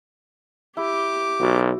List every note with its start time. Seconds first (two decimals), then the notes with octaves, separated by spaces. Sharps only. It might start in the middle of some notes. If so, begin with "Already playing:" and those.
0.77 E4 G4 D6
1.40 B1 F#4